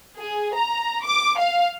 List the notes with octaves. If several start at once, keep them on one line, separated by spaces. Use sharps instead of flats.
G#4
A#5
D6
F5